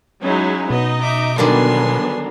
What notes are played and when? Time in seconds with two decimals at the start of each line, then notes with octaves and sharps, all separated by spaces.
0.21 F#3 G#3 C#4 D#4 E4
0.70 B2 B3 D#4 D#5
1.00 E5 D6
1.38 D3 D#3 F#3 G3 B3 D4 G#5 C6